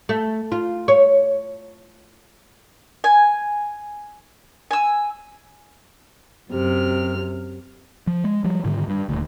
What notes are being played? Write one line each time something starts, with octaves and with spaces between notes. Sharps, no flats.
A3
F4
C#5
G#5
G#5 E6
F#2 C3 F6
F3
G#3
F3 G3
G#2 D3 D#3
G2
D#1 D2